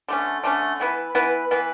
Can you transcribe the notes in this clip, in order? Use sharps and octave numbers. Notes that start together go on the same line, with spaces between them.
D3 A3 C#4
D3 A3 C#4
E3 B3 E4 B4
E3 B3 E4 B4
E3 B3 E4 B4